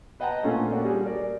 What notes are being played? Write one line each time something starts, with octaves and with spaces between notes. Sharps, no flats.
B4 D#5 F#5 G5 A5 A#5
A#2 A3 C#4 F4 A4 C#5
A#3 D4 F#4
G3 G#4
A#4 D5